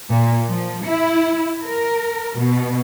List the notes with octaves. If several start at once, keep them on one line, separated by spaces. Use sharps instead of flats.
A#2
F3
E4
A#4
B2